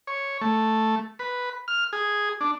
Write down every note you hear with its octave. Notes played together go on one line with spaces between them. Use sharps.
C#5
A3
B4
F6
G#4
D4